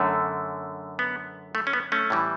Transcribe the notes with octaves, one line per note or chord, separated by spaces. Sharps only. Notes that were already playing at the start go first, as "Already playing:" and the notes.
Already playing: F#2 D3 A3
B3
A3
C#4
B3
A3 C#4
A2 E3 G3